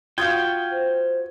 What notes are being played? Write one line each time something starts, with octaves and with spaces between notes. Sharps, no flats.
F4 F#4 F5 G5 D#6 G#6
C5